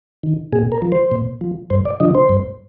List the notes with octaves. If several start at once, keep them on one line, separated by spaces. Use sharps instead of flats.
D#3
A#2 G#4
A#4
F3
C5
A#2
F3
G2 C5
D5
D3 F3 D#5
C5
G2